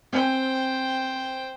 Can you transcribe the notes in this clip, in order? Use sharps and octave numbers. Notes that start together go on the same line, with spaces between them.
C4 C5 G5 G#5